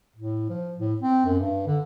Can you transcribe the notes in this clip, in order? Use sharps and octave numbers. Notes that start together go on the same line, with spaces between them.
A2
F3
A2
C4
F#2
G2
D3